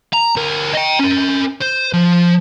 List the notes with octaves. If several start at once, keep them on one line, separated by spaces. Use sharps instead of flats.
A#5
D2 A#4
D#5 G5
C#4 A#4
C5
F3